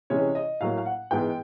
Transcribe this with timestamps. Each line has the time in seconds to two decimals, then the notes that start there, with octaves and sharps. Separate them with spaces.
0.10 C3 E3 G#3 C#4 C#5
0.35 D#5
0.61 A2 F#3 A#3 F5
0.77 F5
0.86 F#5
1.11 G#2 E3 G#3 B3 G5